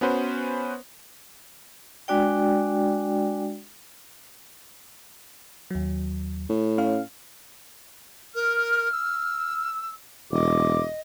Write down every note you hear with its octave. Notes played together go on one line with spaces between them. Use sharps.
B3 C#4 F#4 B4 C5
G#3 D4 F#4 D5 G5
D#2 F#3
A2
C#4 F5
A#4 F6
E6
E1 D#5 D6